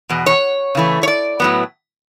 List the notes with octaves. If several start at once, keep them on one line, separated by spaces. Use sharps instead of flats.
E2 B2
C#5
C#3 E3 A3
C#5
D5
A2 F#3 B3